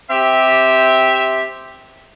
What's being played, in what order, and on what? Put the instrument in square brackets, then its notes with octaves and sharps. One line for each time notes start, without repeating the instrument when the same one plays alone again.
[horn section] C4 G4 E5